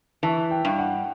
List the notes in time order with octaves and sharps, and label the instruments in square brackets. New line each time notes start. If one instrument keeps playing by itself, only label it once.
[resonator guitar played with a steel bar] E3 [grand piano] A5
[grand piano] G5
[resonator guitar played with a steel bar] G2
[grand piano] F#5